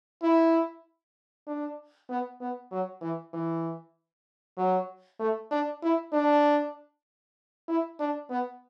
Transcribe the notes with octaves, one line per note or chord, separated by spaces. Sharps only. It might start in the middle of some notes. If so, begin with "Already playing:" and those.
E4
D4
B3
B3
F#3
E3
E3
F#3
A3
D4
E4
D4
E4
D4
B3